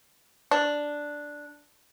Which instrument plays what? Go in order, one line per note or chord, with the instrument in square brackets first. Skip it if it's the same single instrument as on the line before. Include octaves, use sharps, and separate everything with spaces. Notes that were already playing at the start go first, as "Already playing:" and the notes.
[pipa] D4